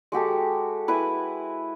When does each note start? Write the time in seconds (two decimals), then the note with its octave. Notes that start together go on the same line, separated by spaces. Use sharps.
0.12 G#3 F#4 G4 A4
0.88 E4 B4 G#5